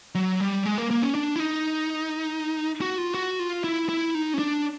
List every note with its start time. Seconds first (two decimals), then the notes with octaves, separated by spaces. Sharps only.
0.15 F#3
0.40 G3
0.66 G#3
0.78 A#3
0.91 A#3
1.02 C#4
1.15 D4
1.36 E4
1.40 D#4
2.81 F#4
2.98 F4
3.14 F#4
3.39 F4
3.64 E4
3.89 E4
4.15 D#4
4.34 C#4
4.39 D4